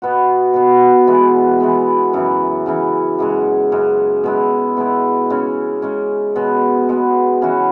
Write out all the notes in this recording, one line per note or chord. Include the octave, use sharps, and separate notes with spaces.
B2 B3 F#4
B2 B3 F#4
E3 G#3 B3
E3 G#3 B3
F#2 C#3 E3
F#2 C#3 E3
F#2 C#3 G#3
F#2 C#3 G#3
B2 G#3 E4
B2 G#3 E4
C#3 G#3 C#4
C#3 G#3 C#4
B2 G#3 B3
B2 G#3 B3
C#3 E3 C#4 F#4